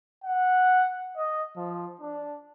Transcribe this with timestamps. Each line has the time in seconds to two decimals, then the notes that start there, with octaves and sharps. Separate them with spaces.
0.24 F#5
1.17 D#5
1.57 F3
2.01 D4